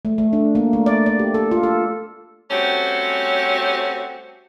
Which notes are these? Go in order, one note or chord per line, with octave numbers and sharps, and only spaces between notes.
A3
A3
D4
A#3
A3
D5
D5
G4
A4
F4
A4
G3 A3 C4 C#4 F#4 G4